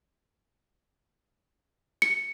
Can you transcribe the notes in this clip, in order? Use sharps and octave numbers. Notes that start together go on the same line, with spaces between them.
C#7